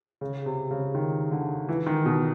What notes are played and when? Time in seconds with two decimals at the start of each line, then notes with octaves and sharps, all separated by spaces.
0.21 C#3
0.46 C3
0.71 C#3
0.95 D#3
1.32 D3
1.69 E3
1.86 D#3
2.06 B2